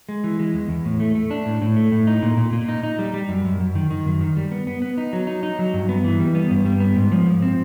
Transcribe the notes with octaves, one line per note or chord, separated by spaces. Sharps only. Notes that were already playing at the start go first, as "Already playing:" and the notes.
G#3
E3
G#3
E2
E2
A2
A3
A3
D4
A2
A2
A3
A2
D#4
A#2
A#2
A#2
D#4
D#4
G3
G3
F#2
F#2
F#2
D#3
D#3
F#2
D#3
G3
B3
B3
B3
D#4
F#3
D#4
D#4
F#3
G2
B3
E3
G3
B3
G2
G3
B3
G#2
F3
G#2
C4